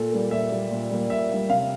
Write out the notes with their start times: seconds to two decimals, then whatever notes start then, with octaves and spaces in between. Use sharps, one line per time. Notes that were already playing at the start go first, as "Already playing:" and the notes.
Already playing: A#2 A4
0.12 G3 A#3
0.31 A#2 E5
0.51 G3 A#3
0.71 A#2
0.91 G3 A#3
1.10 A#2 E5
1.30 G3 A#3
1.49 C3 F5